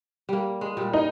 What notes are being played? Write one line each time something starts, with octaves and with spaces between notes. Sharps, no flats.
G3 A#3
G#3
A#2 G3
D#4